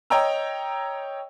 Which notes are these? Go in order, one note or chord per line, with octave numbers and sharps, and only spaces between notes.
C#5 D#5 G5 A#5 E6